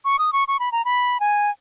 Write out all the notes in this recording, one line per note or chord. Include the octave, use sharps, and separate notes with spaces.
C#6
D#6
C#6
C#6
B5
A#5
B5
G#5